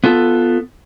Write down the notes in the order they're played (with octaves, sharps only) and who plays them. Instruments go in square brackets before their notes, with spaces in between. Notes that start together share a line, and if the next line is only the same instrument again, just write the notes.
[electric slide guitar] B3 F4 A4